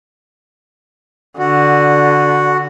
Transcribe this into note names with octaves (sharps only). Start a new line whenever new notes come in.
D3 F#4